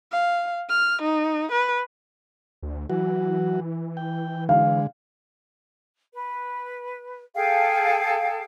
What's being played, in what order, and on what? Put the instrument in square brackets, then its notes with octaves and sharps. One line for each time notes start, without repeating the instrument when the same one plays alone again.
[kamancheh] F5
F6
D#4
B4
[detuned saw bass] D2
[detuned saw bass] E3 [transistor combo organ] F#3 F#4
[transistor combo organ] G5
[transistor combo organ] D3 G#3 [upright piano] F5
[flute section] B4
G#4 A4 F5 G5